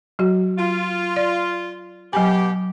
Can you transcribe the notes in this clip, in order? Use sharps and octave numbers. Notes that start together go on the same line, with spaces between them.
F#3 F#4
F4
D5
B2 F#3 B3 G4 G#5